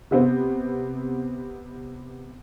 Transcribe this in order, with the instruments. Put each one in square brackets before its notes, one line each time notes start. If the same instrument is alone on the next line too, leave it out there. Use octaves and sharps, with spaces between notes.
[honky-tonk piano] C3 B3 C4